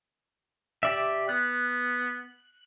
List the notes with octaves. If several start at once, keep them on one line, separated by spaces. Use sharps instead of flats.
G4 D5 E5
B3 F#6